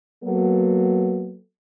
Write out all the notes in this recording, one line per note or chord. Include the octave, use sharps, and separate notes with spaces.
F#3 A#3 B3 A4